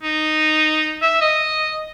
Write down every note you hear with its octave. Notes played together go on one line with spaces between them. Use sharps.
D#4
E5
D#5